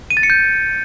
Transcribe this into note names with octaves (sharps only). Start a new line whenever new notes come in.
D#7
A6
C#7
G6